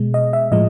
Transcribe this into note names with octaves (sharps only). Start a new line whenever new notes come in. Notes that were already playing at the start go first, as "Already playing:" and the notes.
Already playing: B2 G#3
D#5
E5
A2 F3 G#3 D#5